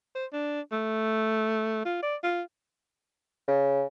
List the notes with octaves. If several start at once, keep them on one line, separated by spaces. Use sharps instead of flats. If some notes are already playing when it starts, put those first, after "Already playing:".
C5
D4
A3
F4
D5
F4
C#3